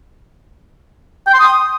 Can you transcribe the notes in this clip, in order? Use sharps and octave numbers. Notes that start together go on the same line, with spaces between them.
G5
C6
D#6